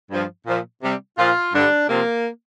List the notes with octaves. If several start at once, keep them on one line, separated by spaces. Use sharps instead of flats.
G2 F3
A#2 F3
C3 G3
A#2 F3 F4
G2 D3 G3 D4
C3 F3 A#3